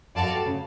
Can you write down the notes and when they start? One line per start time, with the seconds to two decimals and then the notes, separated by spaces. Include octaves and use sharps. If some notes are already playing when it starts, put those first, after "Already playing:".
0.15 F#2 F#4 A4 D5 F5 A5
0.31 G2
0.46 C#3